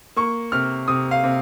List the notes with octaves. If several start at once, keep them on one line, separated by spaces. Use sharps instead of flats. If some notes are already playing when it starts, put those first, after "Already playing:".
A#3 C#6
C3 F6
C3 D#6
F5
C3